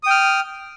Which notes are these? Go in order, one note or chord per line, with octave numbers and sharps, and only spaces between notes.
G5 D#6 F6